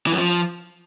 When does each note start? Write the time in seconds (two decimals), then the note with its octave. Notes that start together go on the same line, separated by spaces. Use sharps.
0.07 E3
0.12 F#2
0.18 F3